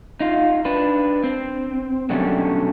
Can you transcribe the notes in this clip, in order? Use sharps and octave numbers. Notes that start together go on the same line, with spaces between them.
D#4 F4
D4 B4
C4
B2 D3 F#3 G3 A3 C#4